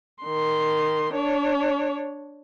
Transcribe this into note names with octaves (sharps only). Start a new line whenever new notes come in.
D#3 C6
D4 C#5